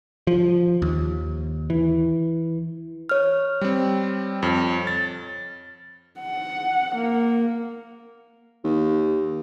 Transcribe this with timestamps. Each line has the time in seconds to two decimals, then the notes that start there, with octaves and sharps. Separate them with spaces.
0.27 F3
0.82 D#2
1.70 E3
3.09 C#5 F6
3.61 G3 C4
4.43 F2
4.87 A6
6.20 F#5
6.96 A#3
8.64 D#2